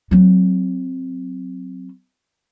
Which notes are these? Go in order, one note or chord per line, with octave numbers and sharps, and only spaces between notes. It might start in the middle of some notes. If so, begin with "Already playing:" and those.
F#3 C4